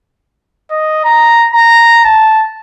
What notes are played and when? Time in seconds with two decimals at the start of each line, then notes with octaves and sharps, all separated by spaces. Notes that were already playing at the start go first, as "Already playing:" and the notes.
0.70 D#5
1.04 A#5
1.52 A#5
2.04 A5